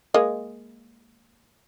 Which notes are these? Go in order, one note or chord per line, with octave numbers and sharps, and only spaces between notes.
G#3 A#3 D#5